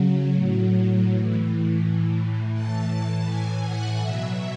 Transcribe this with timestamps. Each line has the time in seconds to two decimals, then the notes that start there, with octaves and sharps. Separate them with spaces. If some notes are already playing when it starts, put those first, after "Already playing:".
Already playing: C#3 F#3
0.34 A2 F#3
1.07 A2 E3
1.80 A2 E3
2.53 A2 E3 A5
2.90 A5
3.26 A2 E3 G#5
3.63 F#5
3.99 B2 F#3 E5